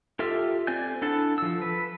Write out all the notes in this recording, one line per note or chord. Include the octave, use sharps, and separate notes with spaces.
F4 G4 A4 E5 F6
C4 D5 G#5 G6
D4 E4 A4 F#5 A5
F3 E6
B4